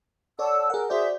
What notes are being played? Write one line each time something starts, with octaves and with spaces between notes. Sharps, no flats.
A4 C#5 D5 F#5 A5 E6
G#4 A#4 F#5
F#4 G#4 C5 D5 E5 G6